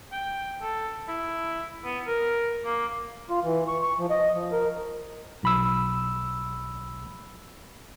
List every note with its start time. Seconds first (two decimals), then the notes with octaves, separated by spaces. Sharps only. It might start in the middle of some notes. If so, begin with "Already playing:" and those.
0.12 G5
0.62 A4
1.08 E4
1.85 B3
2.07 A#4
2.65 A#3
3.30 F4
3.44 E3
3.68 C#6
3.82 C#6
3.98 F3
4.10 D#5
4.34 F3
4.52 A#4
5.43 B1 B5 E6